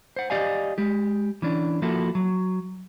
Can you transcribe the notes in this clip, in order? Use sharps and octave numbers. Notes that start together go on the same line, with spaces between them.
C5 F#5
G4 D5 D#5 F5 G#5
G#3 G4
E3 C#4 D4
F3 A#3 E4 F#4 A4
F#3